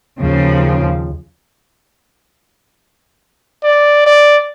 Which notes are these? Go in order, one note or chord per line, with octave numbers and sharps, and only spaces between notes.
D#2 C#3 F3
D5
D5